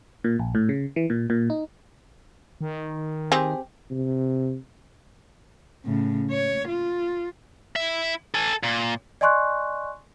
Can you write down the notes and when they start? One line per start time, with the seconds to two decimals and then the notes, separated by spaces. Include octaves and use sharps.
0.24 A#2
0.39 A#1
0.55 A2
0.69 C#3
0.96 E3
1.10 A#2
1.30 A#2
1.50 D#4
2.61 D#3
3.32 C4 G4 G#4
3.90 C3
5.85 A2 C#3
6.31 C#5
6.68 F4
7.76 E4 E5
8.34 A4 G#5
8.63 A#2
9.21 D5 D#5 G#5 C6 C#6 F#6